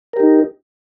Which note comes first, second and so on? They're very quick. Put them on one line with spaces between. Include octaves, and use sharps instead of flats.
A#4 G4 D#4